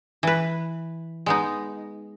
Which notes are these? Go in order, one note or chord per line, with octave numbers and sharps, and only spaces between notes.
E3 B4
G#3 B3 D#4